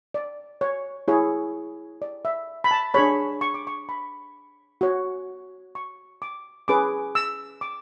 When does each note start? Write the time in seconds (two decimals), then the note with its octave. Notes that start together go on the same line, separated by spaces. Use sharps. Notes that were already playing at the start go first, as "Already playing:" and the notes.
0.14 D5
0.61 C#5
1.08 E4 G#4 C#5
2.02 D5
2.25 E5
2.64 B5
2.71 A5
2.94 D4 G#4 C#5 B5
3.41 C#6
3.54 D6
3.67 C#6
3.89 B5
4.81 F#4 C#5
5.75 C#6
6.22 D6
6.68 C#4 G#4 B4 D6
7.15 E6
7.61 D6